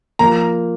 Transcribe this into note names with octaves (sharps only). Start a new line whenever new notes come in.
F3 A#3 F4 A#5